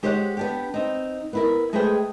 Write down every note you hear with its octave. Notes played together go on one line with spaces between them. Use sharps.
G#3 G4 C5 C#5 E5 F#5
B3 D4 G4
C4 D#4
B3 E4 A#4
G#3 A3 G#4 B4 C5 G5